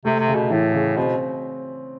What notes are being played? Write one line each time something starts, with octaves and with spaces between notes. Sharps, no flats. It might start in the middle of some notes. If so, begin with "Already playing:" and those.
C3 A3
C3
C#3
B2
A2 E3
C#3
B2 C4